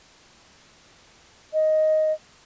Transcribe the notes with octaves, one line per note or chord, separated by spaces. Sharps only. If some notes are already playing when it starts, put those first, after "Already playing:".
D#5